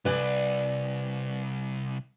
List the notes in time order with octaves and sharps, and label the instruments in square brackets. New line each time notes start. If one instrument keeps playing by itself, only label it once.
[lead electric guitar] C2 [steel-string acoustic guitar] B4 D5 G#5